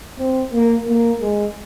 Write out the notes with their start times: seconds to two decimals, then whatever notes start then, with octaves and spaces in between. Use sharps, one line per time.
0.19 C4
0.53 A#3
0.88 A#3
1.22 G#3